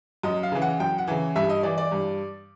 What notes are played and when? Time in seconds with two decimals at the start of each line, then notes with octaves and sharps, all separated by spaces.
0.23 F#2 D#5
0.43 F5
0.52 C#3 E3
0.62 F#5
0.80 F#2 G5
0.98 F#5
1.08 C#3 E3
1.36 G2 E5
1.49 D#5
1.63 E3 D5
1.78 D5
1.91 G2